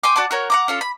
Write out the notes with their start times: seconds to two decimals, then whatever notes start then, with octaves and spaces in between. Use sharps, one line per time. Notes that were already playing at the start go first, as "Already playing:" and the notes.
0.03 G5 G#5 C6 D6
0.16 F#4 D5 A5 D6
0.31 F#4 A#4 C#5
0.50 F#5 A#5 D6
0.68 C#4 F4 A4
0.81 B5